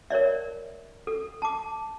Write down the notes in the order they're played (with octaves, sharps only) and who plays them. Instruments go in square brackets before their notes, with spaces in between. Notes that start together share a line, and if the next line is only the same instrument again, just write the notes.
[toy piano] A#4 C#5 D5 E5
A4
A5 D6